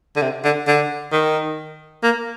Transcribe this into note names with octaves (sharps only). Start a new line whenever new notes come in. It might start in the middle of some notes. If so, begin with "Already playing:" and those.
D3
C3
D3
D3
D#3
A#3